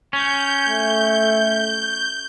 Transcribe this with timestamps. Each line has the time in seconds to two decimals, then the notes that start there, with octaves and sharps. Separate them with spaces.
0.13 C#4 G6
0.70 A3